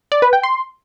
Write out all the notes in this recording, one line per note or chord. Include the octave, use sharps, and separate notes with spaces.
D5
B4
G5
C6